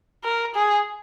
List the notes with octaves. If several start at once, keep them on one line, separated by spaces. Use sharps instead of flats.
A#4
G#4